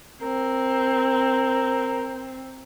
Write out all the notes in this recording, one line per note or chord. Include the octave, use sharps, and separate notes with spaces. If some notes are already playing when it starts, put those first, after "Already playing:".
C4 A#4